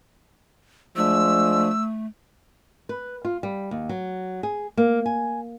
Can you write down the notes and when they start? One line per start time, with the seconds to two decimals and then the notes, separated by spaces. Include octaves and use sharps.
0.96 F3 G#3 A3 D4 E6
2.89 B4
3.25 F4
3.43 G3
3.71 D#2
3.89 F#3
4.43 G#4
4.77 A#3
5.06 G#5